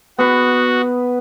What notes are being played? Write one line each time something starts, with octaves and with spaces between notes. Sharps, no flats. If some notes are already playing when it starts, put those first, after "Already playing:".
B3 F#4 B4